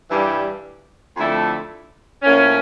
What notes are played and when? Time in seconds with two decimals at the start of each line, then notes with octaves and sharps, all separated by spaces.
0.10 G2 E3 G3 D4
1.16 F2 D3 A3 E4
2.22 A2 F3 A#3 C#4